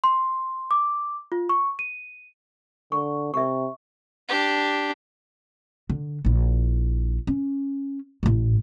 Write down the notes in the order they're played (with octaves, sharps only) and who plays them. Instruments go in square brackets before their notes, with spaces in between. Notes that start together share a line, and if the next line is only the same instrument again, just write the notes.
[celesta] C6
D6
F4
C#6
D#7
[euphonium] D3 [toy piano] C#6
[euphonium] C3 [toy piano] E5 C#6
[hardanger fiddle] D4 G4
[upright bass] D3
A#1 E4
C#4
A1 A2